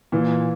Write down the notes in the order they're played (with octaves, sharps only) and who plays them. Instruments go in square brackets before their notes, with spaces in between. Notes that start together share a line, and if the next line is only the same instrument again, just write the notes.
[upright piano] A#2 [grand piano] E3